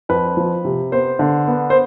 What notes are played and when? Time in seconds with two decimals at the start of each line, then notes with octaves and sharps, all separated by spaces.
0.09 F2 B4
0.37 F3
0.65 C3
0.92 B3 C5
1.19 D3
1.47 B3
1.70 C5